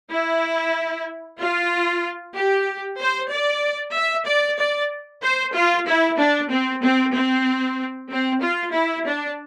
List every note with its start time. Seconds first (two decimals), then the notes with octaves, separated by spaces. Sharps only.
0.11 E4
1.39 F4
2.35 G4
2.99 C5
3.30 D5
3.94 E5
4.27 D5
4.58 D5
5.22 C5
5.54 F4
5.87 E4
6.18 D4
6.50 C4
6.83 C4
7.14 C4
8.10 C4
8.42 F4
8.73 E4
9.06 D4